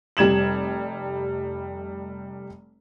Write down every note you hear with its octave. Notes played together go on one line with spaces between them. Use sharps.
F1 G3 G#6 E7 F#7